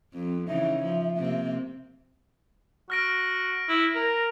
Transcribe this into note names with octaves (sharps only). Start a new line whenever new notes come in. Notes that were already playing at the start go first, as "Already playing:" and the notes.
F2 C4
C#3 E3 D#4 E5
F3
C3 A#3 C4
F#4 F6 A#6 D7
E4
A#4